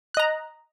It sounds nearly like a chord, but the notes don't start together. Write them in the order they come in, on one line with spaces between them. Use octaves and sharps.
F#6 D#5 A#5